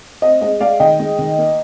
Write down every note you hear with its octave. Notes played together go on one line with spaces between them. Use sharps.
C4 D#5
G#3 D#5
G#3 D5 F5
D#3 D#5 G5
G#3
D#3
A#3